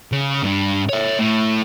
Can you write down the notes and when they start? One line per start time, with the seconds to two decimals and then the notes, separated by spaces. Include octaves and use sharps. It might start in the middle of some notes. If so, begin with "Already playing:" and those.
0.12 C#3
0.43 G2 D4
0.89 C#5 E5
1.19 A2